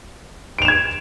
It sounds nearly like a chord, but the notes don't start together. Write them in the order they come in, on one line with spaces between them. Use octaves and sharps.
D7 F7 E7 G#6